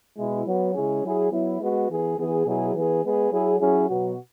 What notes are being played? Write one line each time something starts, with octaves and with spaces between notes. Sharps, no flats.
B2 G#3 E4
F#3 B3 F#4
C#3 G#3 C#4 E4 G#4
F#3 E4 G#4
F#3 B3 E4
G#3 B3 F#4
E3 B3 G#4
E3 B3 G#4
B2 F#3 E4 G#4
E3 B3 G#4
G#3 B3 G#4
F#3 E4 G#4
F#3 C#4 E4 G#4
B2 F#3 B3 F#4